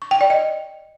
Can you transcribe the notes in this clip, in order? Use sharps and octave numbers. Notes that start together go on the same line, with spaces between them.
C#6
G5
D5
D#5